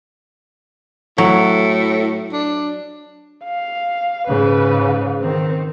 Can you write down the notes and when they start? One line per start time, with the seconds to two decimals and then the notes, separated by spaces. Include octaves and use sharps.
1.18 A2 F#3
2.33 D4
3.44 F5
4.28 G#2 C#3 B4
5.22 D#3 C4